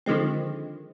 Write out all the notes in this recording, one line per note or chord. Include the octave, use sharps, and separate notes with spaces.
D3 D#3 F3 G#3 C4